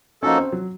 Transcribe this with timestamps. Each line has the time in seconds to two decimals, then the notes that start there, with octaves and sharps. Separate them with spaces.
0.23 F3 A#3 C#4 D#4 F#4 A4
0.38 C4
0.53 F#3